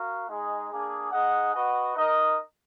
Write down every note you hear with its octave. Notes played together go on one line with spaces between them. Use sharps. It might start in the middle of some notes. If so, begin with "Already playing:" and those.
Already playing: F#4 A#4 F5
G#3 D#4 G#4
A#3 D4 G#4
D#4 G#4 D#5 F#5
F#4 B4 D#5 F#5
D#4 A#4 D#5